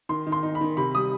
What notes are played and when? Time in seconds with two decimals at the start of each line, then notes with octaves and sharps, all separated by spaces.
0.09 D#3 C6
0.27 D#3
0.32 C6
0.43 D#4
0.55 B5
0.61 D#3
0.77 C3 B5
0.95 G3 D#6